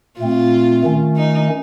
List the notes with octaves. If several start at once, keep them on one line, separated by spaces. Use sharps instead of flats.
A#2 A3 C4 F4
D#3 A3 C#4
D#4